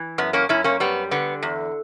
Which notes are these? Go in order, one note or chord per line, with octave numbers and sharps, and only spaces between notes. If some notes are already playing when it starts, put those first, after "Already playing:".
Already playing: E3
F#2 B3
A#3 C#4
F#2 C#4 E4
A#3 C#4
G3 B3
D3 B3
E2